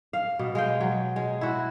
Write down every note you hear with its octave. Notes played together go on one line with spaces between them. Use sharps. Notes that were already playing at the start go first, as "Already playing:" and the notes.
F5
B2
G#3 F5 G5
F#3
G#3
E4 F#4